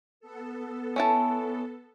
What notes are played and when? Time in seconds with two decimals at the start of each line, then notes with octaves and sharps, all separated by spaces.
0.20 B3 A4
0.96 C#4 E4 A5